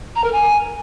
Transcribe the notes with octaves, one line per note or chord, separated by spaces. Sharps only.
A#5
A#4
G#5